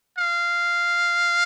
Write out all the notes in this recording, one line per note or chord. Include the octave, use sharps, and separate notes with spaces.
F5